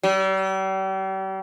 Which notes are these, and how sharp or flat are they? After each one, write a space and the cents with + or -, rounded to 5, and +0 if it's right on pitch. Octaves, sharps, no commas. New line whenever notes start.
G3 -40